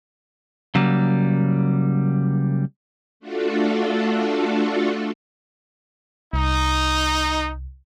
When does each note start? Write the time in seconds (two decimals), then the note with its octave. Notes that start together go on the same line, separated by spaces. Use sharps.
0.75 C#3 F#3 G3 A#3
3.20 A3 D4 F4 F#4 A4
6.33 C2 D#4